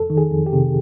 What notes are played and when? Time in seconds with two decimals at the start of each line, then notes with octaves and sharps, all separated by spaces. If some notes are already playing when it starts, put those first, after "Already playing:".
Already playing: F2 A4
0.10 D#3
0.18 G#4
0.31 F2
0.46 G4
0.53 C3